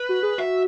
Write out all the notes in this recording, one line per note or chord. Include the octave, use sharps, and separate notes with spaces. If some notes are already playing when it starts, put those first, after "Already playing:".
Already playing: B4
F#4
G#4
F#4 E5